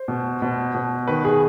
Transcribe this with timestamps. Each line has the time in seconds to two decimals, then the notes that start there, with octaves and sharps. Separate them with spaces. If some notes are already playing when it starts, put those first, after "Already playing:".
Already playing: C5
0.08 B2
0.42 B2
0.74 B2
1.08 D#3 B4
1.25 G#4